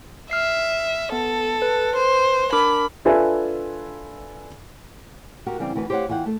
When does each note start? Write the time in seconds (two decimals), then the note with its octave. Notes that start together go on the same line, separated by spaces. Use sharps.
0.31 E5 F6 C7
1.12 B3 A4
1.62 B4
1.96 C5
2.52 D4 A#4 B5 D6
3.05 D4 F4 A4 B4 E5 G#5
5.46 F#4 G4 A#4
5.59 C#3 E3 G3 C4 G4
5.75 D2 E3 F#4 B4
5.90 G4 C5 C#5 D#5 F5 F#5
6.09 E2 E3 F4 F#5 G5
6.26 A3 A4